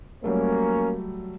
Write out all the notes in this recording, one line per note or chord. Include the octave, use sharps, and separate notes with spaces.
F#3 G3 A3 A#3 C#4